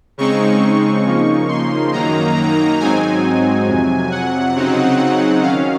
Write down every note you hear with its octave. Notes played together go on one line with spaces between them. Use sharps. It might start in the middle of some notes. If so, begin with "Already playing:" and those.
C#3 G#3 C4 D#4 C#6
C#3 F3 A#3 D#4
C6
F#2 D#3 F#3 A#3 D#4 A#5
G#2 F#3 C4 D#4 G#5
F2 C3 F#3
F#5
C#3 F#3 C4 D#4
D#3 F#3 C#4 F5